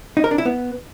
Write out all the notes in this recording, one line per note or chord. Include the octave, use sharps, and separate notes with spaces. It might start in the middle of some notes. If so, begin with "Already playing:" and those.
D#4
A#4
D4
E4
B3